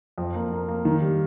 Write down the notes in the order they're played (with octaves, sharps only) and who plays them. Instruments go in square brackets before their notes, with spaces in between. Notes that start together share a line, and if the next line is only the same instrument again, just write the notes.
[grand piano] F2
A#3
A#3
A#3
D#3
G3